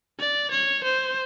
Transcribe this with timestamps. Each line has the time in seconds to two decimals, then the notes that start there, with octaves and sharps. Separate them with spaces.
0.19 D5
0.52 C#5
0.84 C5